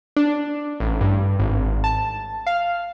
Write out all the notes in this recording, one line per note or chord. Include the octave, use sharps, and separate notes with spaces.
D4
A1
G2
G#1
A5
F5